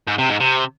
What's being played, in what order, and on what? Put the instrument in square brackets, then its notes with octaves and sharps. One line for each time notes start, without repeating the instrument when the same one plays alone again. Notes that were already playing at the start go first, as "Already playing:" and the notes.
[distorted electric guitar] G#2
C3
G#2
C3